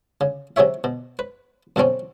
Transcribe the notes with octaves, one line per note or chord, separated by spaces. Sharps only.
C#3
C3 F#3 G#4 C#5 E5
B2
B4
F2 B2 F#3 C4 C#4